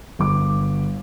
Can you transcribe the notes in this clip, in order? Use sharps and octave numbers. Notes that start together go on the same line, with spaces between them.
G1 D6